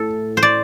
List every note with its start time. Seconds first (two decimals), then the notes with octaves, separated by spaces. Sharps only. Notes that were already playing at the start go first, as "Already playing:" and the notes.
Already playing: A2 A4
0.37 C5
0.43 D5